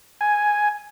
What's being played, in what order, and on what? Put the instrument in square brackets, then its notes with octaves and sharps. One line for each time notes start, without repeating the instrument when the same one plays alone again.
[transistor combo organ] G#5